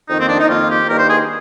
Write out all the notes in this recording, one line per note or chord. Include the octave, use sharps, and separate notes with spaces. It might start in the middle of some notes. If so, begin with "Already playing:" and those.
F2 D#3 A#3 D#4
C4
D4
D#4
F2 D#3 A#3 F4
G4
G2 D#3 A#3 A#4
C5
G#4